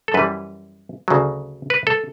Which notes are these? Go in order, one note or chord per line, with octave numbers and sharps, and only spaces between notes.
A4
F#2 E3 G3 B4
D2 C#3 F#3
B4
A4